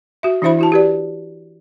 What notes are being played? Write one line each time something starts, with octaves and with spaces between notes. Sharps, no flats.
F#4 E5
E3 D4 E4 C5 E5 B5
E4 F#4 A5
G4 B4 D5